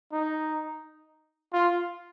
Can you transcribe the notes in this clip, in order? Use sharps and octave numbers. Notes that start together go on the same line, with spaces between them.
D#4
F4